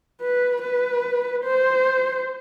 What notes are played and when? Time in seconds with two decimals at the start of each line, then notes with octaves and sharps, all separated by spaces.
0.21 B4
0.62 B4
1.44 C5